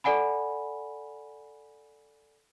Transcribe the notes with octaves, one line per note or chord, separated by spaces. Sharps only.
A4 D5 F#5 G#5 B5